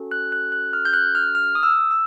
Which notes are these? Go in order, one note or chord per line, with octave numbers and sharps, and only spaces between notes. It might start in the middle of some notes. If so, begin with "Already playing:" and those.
Already playing: C#4 F#4 A4
F#6
F#6
F#6
F6
G6
F#6
F6
F6
D#6
E6
E6